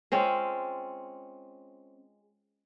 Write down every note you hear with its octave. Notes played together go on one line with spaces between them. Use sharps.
G#3 C4 C#4 F4